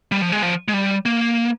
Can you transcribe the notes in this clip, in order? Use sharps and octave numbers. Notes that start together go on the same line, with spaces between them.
G3
F3
G#3
F3
G#3
G3
A#3